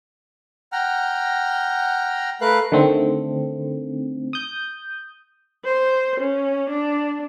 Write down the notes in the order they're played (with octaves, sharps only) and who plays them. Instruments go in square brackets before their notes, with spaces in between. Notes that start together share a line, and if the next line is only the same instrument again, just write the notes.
[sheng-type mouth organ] F#5 G5 A#5 F6
A3 A#4 B4 F5 F#6
[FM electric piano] D3 D#3 A3 C4
D#6 G6
[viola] C5
C#4
D4